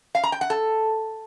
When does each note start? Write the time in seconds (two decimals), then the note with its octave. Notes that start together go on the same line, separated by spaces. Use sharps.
0.15 F5
0.23 A#5
0.32 G5
0.41 F#5
0.50 A4